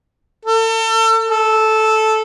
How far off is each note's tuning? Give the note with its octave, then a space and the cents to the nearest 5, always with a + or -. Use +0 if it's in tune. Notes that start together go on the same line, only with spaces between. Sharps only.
A4 +35
A4 -10